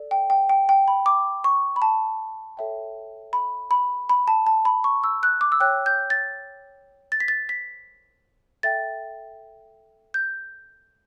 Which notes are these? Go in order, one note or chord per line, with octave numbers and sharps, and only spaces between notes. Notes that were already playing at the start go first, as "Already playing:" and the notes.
Already playing: A4 D5
G5
G5
G5
G5
B5
D6
C#6
B5
A5
A4 C#5 E5 G5
B5
B5
B5
A5
A5
B5
C#6
E6
F#6
D6
E6
C#5 G5 F#6
G6
A6
A6
B6
A6
B6
A4 E5 G5 A6
G6